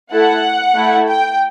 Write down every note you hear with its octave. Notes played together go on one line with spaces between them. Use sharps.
A3 E4 A4 F#5
A3 E4 A4
G5